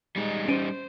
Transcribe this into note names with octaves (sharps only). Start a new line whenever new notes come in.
G3 G#3 D#4
C#4 C5 D7 D#7